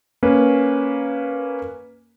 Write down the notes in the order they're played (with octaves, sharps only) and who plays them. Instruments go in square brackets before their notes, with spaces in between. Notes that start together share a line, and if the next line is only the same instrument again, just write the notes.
[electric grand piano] A#3 C#4 B4